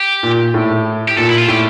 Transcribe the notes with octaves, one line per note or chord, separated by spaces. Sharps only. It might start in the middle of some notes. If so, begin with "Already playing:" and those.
Already playing: G4
A#2
A2
G4
A#2 A4
E4
F4
A2 G4